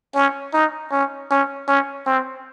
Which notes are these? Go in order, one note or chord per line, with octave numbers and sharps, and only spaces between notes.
C#4
D#4
C#4
C#4
C#4
C4